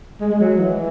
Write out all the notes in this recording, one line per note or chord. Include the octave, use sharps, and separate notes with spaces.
G#3
G#3
F#3
E3